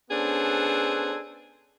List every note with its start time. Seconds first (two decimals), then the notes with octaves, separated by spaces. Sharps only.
0.11 B3 C#4 D4 G#4 A4 C5